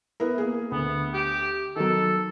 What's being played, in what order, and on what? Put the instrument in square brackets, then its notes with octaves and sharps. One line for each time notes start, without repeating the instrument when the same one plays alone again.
[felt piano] B3 E4 A#4
A#3 G#4
[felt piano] D2 [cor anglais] B3
[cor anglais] G4
[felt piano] D#3 F#3 [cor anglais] A4